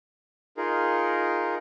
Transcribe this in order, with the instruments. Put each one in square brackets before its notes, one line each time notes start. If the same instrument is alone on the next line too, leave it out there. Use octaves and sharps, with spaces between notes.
[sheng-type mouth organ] D#4 F4 G#4 A#4